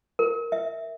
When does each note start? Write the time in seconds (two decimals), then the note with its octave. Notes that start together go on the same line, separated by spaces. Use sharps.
0.19 A#4
0.52 E5